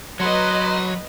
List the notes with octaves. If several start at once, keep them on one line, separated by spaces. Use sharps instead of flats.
F#3 B4 C#5 D#5 C6